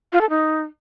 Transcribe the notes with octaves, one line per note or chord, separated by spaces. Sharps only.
F4
A4
D#4